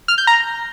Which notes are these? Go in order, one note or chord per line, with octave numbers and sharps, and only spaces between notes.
F6
G6
A#5